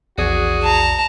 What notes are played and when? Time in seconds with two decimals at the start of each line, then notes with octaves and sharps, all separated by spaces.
0.18 A#1 E2 F#4 G#4 D5
0.63 A5 A#5